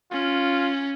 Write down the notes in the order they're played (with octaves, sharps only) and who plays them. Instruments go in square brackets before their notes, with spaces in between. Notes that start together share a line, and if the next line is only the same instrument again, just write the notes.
[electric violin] C#4 [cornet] F4